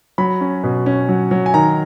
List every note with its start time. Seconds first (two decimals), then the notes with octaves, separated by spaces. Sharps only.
0.18 F#3 B5
0.41 C#4
0.63 B2
0.86 C#4
1.09 F#3
1.31 F#3
1.46 G#5
1.54 D#3 A#5